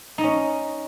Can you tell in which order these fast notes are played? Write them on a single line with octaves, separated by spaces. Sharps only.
D#4 D#5 C#4